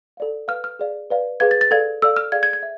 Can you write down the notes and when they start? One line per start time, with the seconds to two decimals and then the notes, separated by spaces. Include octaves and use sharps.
0.17 A4 D5 F5
0.48 B4 F5 F6
0.64 F6
0.79 G#4 D5 F5
1.10 B4 D5 F5
1.40 G#4 B4 F5 G#6
1.51 A6
1.61 A6
1.71 A4 D5 F5 G#6
2.02 A4 D5 F5 E6
2.17 F6
2.32 G#4 D5 F5 G#6
2.43 G#6
2.53 G#6
2.63 E5